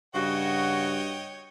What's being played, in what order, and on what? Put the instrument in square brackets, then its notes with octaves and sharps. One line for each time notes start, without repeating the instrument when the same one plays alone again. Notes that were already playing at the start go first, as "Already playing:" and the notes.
[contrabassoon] G2 [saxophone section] C#3 F#4 [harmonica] C#5 D#5 G5